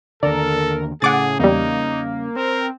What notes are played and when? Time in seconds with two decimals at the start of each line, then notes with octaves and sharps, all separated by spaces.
0.23 D#2 D3 A4 A#4 D5
1.02 A2 C#3 G#4 F#5 D6 A6
1.39 E2 G3 A#3 D#4
2.36 C4 A#4